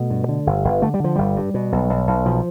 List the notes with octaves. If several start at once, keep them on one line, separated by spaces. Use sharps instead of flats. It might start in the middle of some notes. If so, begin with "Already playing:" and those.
Already playing: B2 A3
G2
D3
G1
G1
D3 A3
G3
D3 F3
G1 G3
G2
B2
B1
B1
B1
B2 F3